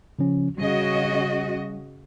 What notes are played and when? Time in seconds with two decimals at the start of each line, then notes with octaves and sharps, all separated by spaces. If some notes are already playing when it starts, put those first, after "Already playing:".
0.19 C#3 F3 C#4
0.58 C#3 G3 F#4 D#5